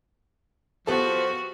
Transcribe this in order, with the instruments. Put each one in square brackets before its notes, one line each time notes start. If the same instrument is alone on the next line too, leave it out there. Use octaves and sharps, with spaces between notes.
[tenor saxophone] F3 [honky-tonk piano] B3 G4 A4 [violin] F#4